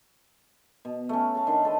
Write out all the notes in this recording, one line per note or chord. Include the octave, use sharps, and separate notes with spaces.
B2
A3 C#4
A4 F5
D#3 D4 C6
A4 B4